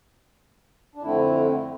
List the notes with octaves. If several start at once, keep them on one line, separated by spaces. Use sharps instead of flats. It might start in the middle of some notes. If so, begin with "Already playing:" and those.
D4
F2 D3 A3 C4 E4